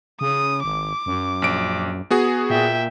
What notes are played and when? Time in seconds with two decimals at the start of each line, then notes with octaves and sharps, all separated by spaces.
0.21 C#3 D#6
0.64 G#1 D6
1.06 F#2
1.42 A#1 D7
2.11 B3 F#4 G#4
2.50 A#2 E5 G5